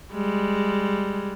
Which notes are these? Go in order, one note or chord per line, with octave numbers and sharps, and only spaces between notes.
G3 G#3